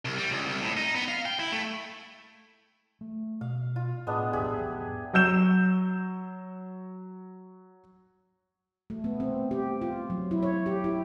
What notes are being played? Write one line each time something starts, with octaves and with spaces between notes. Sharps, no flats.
C2
G3
C#2
C2
A2
D#4
B3
F5
G5
E4
A3
A3
B2 F5
F4
A2 G#3 B3 D4
A#1 E2 G#2 G4 G#4 E5
F#3 E6 G6 E7
A3
B3
C4
G4
F4
F#3
E4
C#5
G4
E4